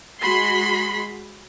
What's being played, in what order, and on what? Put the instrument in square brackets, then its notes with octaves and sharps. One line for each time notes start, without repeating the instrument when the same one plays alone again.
[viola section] G#3 F#4 B5 C6